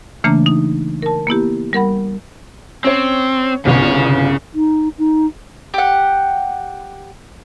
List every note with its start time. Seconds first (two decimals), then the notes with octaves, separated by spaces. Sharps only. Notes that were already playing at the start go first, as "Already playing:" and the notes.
0.24 C#3 E3 A3 A#3 D4 A#5
0.46 D#4
1.02 A#4 A5
1.27 A#3 B3 E4 G4
1.73 G3 A#4 F#5 B5
2.84 C4 C#4 C#5
3.65 G1 C2 C#3 B3 C#5
4.54 D#4
4.98 D#4
5.74 G4 F#5